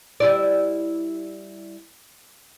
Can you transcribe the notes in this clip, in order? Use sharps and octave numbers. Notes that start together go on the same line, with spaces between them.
G3 E4 D5